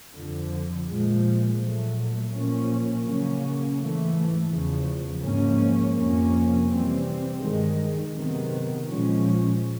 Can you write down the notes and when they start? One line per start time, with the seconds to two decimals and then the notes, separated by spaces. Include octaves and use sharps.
0.14 F2 D3 F3
0.87 A#2 F3 G#3
1.59 A#2 F#3 A3
2.33 A#2 F3 A#3 C#4
3.05 C#3 F#3 A#3 C#4
3.77 G#2 E3 A3
4.51 E2 C#3 F3
5.22 G#2 F3 A#3 C#4
5.95 F2 C3 F3 A#3 C#4
6.68 C3 E3 G3 C4
7.41 G2 D#3 G#3
8.14 C3 D#3 F#3 B3
8.86 A#2 F3 G#3 C#4